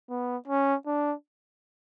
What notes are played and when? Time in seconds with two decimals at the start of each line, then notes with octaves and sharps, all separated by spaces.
0.09 B3
0.47 C#4
0.86 D4